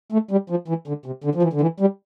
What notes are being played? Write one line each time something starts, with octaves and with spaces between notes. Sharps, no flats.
A3
G3
F3
E3
D3
C3
D3
F3
E3
D3
E3
G3